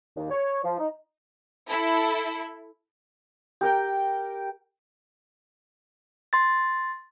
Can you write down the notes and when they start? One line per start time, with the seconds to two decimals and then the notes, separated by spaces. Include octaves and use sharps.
0.17 D#2
0.30 C#5
0.63 F3
0.79 D#4
1.69 E4 A4
3.61 G4 A#4 G5
6.33 C6 A6